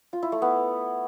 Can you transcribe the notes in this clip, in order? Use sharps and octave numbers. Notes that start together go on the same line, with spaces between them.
F4
E4
A3
B3